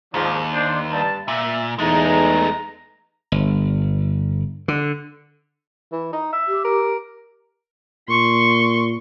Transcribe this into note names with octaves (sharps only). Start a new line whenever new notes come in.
D#2 G#2 F3 D4
D4 C5
G2 A5
A#2 E5
E2 E3 G#3 A3 D#4 A#5
G1
D3
E3
D#4
E5
G4
A#4
A#2 C6 C#6